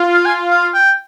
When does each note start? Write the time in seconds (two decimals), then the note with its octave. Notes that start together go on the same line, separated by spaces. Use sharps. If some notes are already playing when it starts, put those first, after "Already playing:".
Already playing: F4
0.14 F5
0.25 G#5
0.50 F5
0.74 G5